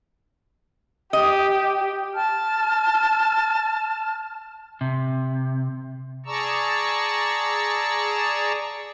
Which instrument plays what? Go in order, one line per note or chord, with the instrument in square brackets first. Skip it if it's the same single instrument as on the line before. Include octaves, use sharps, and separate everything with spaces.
[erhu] G4 [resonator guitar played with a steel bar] D#5
[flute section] A5 F6
[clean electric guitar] C3
[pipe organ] G#4 D5 A5 A#5 C#6 E6